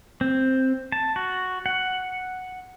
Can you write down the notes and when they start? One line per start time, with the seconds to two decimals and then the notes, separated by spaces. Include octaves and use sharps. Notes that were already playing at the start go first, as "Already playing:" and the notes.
0.21 C4
0.92 A5
1.16 F#4
1.66 F#5